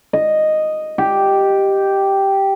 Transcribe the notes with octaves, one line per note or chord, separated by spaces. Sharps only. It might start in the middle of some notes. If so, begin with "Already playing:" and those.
D#5
G4